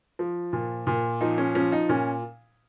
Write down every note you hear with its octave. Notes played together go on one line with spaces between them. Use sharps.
F3
A#2
A#2
F3 D#4
C#4
F3 C#4
D#4
A#2 C#4